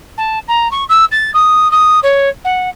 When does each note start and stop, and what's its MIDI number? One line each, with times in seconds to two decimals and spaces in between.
0.17 0.39 81
0.48 0.70 82
0.71 0.84 85
0.89 1.05 88
1.11 1.31 93
1.34 1.70 87
1.71 1.99 87
2.03 2.29 73
2.44 2.69 78